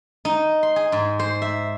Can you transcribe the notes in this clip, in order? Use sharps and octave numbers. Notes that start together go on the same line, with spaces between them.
D#4
C6
G#4
G#2
C5
E5